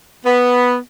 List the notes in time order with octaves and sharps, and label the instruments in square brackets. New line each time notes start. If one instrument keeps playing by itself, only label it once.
[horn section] B3